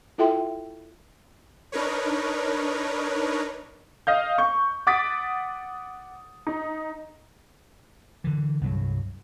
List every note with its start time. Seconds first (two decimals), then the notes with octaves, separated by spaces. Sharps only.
0.18 E4 F4 A4 E5 G5 C6
1.72 D4 D#4 A#4 B4 C#5
4.07 D#5 F5 G6
4.38 C#6 G6
4.87 F#5 D6 D#6 A6 B6 D7
6.47 D#4
8.24 D3 E3
8.61 C2 G2 F#3